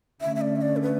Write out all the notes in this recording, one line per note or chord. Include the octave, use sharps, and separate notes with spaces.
D3 A3 C#4 E5
E5
D5
E5
D5
A4
B4